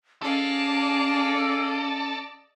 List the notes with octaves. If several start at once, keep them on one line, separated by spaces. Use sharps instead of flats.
C#4 G#4 A4 D5 D#5 F5